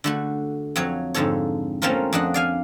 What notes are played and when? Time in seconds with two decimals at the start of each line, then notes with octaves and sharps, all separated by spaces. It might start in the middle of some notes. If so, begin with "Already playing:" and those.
0.04 D3 A3 F#4
0.76 F2 F#3 C#5
1.14 F2 G#2 D3 A4 C#5
1.82 A3 A#3 C4 C#4 F4 A#4
2.13 F2 D4 D#5 F#5
2.34 D5 F5 G#5